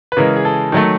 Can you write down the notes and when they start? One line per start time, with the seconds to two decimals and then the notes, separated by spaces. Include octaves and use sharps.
0.12 B4
0.17 C#3 E3 G#3 A#4
0.36 G#4
0.45 A4
0.72 D#3 F#3 A3